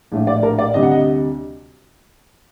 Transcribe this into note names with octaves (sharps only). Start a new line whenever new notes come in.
A#1 A2 A3 D4
D5
A#4
D5
D2 C3 G3 D4 D#5
F#5
D#5